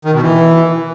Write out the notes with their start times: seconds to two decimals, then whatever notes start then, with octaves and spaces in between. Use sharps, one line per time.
0.05 D#3
0.14 B2
0.23 E3